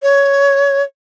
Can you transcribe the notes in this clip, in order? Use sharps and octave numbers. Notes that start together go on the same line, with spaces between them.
C#5